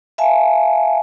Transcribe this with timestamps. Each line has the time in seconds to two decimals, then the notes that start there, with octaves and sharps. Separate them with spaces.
0.18 E5 F5 G#5 A5